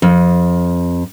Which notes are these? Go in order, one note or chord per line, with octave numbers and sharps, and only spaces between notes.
F2